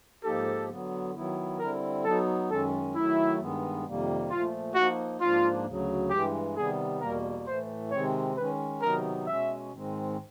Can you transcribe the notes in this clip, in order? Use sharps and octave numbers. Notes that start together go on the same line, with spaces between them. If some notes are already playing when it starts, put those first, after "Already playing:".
G#2 F3 A#3 D#4 G4 A4
D3 F#3 B3
D#3 F#3 B3 E4
D3 G3 C4 E4 A#4
F#3 B3 D#4 A4
F#2 D#3 G#3 C#4 A4
D#3 F#3 A3 E4
G2 D#3 G#3 B3
F2 C3 D#3 G3 A#3
A#2 F3 A3 F4
F3 A#3 D#4 F#4
G#2 F3 A#3 D4 F4
D2 C#3 F#3
G2 E3 G#3 G4
C3 D#3 G3 B3 G#4
E2 B2 G3 A#3 A#4
A2 E3 A3 C5
C3 D#3 G#3 C4 C#5
D#3 G#3 C#4 B4
C3 D#3 F#3 B3 D#4 A#4
B2 G#3 C#4 E5
G#2 D#3 G#3 C4